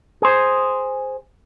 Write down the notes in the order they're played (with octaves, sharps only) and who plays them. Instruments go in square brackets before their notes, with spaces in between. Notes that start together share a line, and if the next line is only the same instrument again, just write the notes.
[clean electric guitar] G#4 C5